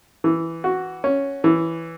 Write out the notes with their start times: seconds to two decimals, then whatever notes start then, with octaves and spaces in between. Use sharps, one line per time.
0.24 E3
0.64 F#4
1.04 C#4
1.44 E3